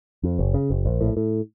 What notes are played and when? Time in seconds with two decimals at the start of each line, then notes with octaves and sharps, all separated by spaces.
0.23 F2
0.39 F#1
0.54 C#3
0.70 F#1
0.86 A#1
1.01 A2
1.17 A2